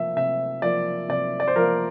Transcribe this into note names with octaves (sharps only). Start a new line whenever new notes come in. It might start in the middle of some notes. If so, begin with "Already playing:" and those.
Already playing: C3 F3 A#3 E5
C3 E5
F3 A#3 D5
C3 D5
D5
C5
F3 A#3 A#4